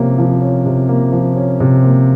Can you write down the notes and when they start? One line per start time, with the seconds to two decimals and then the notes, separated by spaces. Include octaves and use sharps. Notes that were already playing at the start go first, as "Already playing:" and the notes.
Already playing: C3 F3 A#3 C#4
0.18 F3
0.42 C#4
0.66 C3
0.89 A#3
1.12 F3
1.36 C#4
1.60 C3
1.84 A#3